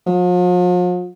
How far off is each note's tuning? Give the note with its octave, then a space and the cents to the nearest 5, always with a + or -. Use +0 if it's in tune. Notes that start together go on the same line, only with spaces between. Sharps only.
F3 +45